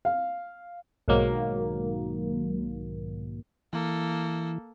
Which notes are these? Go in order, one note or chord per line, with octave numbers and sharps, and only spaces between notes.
F5
B1 G#2 D#3 F#3 A#3
E3 A#3 A4